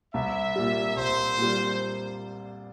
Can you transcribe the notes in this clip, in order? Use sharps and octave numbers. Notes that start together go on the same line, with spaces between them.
C2 E5
A#2 G3
C2 C5
A#2 G3